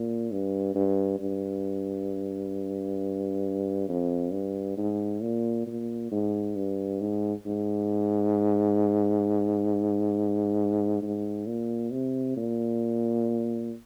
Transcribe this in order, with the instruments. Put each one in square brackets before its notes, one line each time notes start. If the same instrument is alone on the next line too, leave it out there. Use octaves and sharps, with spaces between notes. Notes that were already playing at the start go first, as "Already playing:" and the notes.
Already playing: [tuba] A#2
G2
G2
G2
F2
G2
G#2
A#2
A#2
G#2
G2
G#2
G#2
G#2
A#2
C3
A#2